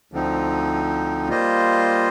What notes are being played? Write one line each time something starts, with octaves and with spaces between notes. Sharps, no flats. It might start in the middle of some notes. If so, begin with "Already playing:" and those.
D2 D3 F3 C4 D#4
G3 A#3 F4 C5 D#5